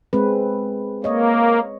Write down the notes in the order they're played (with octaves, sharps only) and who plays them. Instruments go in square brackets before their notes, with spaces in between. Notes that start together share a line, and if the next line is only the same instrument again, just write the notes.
[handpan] G#3 C4 B4
[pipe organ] A#3 [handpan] C#5 D#5